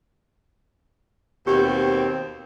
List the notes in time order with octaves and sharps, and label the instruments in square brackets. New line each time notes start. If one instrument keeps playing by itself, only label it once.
[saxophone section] D#2 B2 C4 [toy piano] G4